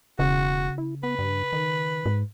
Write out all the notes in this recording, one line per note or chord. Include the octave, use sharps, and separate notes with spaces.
E1 C#3 F#4
E4
B3 B4
G2
D#3
G#2